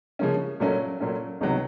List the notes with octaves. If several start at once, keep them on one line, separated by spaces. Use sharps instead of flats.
C#3 F3 A#3 C#4
A#2 F#3 A3 C#4
A#2 F#3 A3 C#4
C#2 C3 D#3 F#3 B3